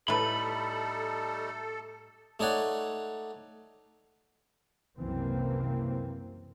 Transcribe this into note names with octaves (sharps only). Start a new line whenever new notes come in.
A2 G3 A3 D#4 A4 B4 B5
A3 D#4 C#5 D5 F#5
C2 F#2 C#3 E3 A#3 C4